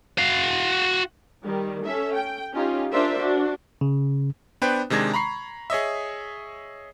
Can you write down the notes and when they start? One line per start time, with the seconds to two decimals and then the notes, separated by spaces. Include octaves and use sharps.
0.18 F#4 F5
1.43 D#3 G3
1.84 C#4 A4 E5
2.14 G5
2.53 C#4 D#4 F4 G4
2.91 D4 F4 A#4 C5 D5 E5
3.20 D4 F#4
3.81 C#3
4.62 B3 D4 B4 C5 G5
4.90 C3 D#3 G#3 D4 G#6 A#6
5.14 A#5 B5 C#6 C7
5.70 G#4 C#5 D#5 E5